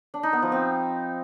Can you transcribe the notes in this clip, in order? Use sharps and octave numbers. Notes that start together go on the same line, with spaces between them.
D4
D#4
B3
F3
C4